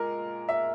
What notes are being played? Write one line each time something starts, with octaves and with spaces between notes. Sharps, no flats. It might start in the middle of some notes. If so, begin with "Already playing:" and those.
Already playing: A#2 G#3 A#4
E5